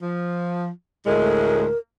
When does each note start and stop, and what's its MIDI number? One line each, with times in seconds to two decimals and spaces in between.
0.02 0.69 53
1.07 1.66 38
1.07 1.66 45
1.07 1.66 56
1.07 1.78 70